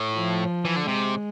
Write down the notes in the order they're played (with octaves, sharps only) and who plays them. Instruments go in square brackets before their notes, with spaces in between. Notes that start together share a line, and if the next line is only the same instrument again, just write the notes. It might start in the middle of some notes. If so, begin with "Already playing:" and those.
Already playing: [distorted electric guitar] A2
[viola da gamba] F3
[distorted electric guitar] E3
D3
[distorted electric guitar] C3 [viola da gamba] G#3